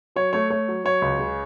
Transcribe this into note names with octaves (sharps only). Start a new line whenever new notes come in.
F#3 C#5
A3 C#5
A3 C#5
F#3
F#3 C#5
C#2
C#3